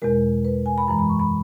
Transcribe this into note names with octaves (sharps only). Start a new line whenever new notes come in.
E2 B2 G#3 A#4
B4
G#5
B5
F#2 E3 G#3 A#5
B5
C#6
B5